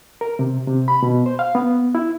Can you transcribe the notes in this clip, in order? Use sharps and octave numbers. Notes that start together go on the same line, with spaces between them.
A#4
C3
C3
B5
B2
C5
F5
B3
E4